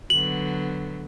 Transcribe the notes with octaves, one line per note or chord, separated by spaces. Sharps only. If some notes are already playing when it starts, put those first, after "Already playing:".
D3 F#3 B3 F#7